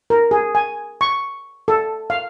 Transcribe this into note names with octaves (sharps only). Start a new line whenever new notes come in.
A#4
G#4
G#5
C#6
A4
F5